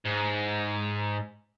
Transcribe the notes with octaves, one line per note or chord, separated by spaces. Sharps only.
G#2